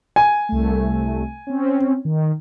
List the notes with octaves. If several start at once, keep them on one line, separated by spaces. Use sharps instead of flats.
G#5
C2 A3
C4 C#4
D#3